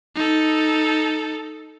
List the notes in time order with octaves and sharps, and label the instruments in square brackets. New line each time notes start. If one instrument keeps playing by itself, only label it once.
[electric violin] D#4 A4